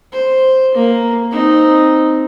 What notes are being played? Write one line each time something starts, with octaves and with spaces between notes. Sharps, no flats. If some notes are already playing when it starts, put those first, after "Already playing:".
C5
A#3
C4 D#4